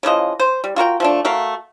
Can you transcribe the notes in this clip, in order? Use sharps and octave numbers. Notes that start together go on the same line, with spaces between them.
C#3 E3 F3 D#5
C5
G3
F4 F#4 A#4 G5
F3 A3 D4
A3 F#4 A#4 F5